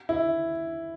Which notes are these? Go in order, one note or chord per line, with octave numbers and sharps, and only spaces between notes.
E4